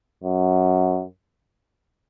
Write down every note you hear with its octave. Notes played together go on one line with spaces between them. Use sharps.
F#2